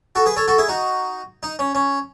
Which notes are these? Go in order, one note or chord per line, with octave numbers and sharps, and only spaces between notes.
F#4 A4
G#4 B4
A4 C#5
F#4 A4
E4 G#4
D#4 F#4
D#4
C#4
C#4